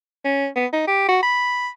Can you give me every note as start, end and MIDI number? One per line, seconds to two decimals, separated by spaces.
0.25 0.47 61
0.56 0.66 59
0.73 0.87 63
0.87 1.07 67
1.08 1.18 66
1.23 1.68 83